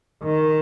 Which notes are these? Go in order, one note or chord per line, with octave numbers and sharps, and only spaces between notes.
D#3